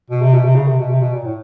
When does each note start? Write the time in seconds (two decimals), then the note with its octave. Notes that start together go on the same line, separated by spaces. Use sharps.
0.10 B2
0.22 C3
0.34 B2
0.45 C3
0.55 C#3
0.67 C3
0.79 B2
0.90 C3
1.01 B2
1.13 A#2
1.25 A2